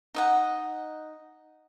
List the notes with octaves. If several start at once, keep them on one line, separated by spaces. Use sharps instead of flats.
D#4 D#5 F#5